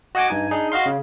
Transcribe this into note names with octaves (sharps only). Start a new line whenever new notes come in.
F#4 D#5 F#5 G#5 D6
G2 D#4 G#5
D4 D#4 G#4
F#4 D#5 F5 C6
C#3